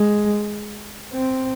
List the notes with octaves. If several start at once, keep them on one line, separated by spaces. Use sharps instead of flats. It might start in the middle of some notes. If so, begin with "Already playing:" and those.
Already playing: G#3
C4